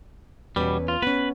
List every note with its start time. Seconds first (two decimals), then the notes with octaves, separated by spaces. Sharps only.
0.56 E2 B2 G3 C#4 B4
0.88 F4
1.02 B3 C#4 B4